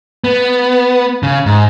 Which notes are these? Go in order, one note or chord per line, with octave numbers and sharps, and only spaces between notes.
B3
C#3
G#2